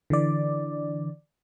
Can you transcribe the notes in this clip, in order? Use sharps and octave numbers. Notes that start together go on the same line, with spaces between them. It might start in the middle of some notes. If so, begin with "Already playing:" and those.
D3 E3 D5